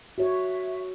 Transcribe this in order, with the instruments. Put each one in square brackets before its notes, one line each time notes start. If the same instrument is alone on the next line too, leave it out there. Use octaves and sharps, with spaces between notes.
[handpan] F#4 C#5 [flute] E5